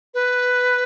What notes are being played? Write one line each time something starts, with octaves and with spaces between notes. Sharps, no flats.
B4